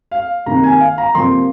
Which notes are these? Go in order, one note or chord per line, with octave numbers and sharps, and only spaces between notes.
F5
C3 D#3 A#3 A#5
G#5
F5
A#5
C3 F3 A#3 C6